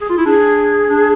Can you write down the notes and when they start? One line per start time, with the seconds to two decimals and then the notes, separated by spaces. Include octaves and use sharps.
0.02 G#4
0.10 F4
0.17 E4
0.26 D4 G#4
0.90 D4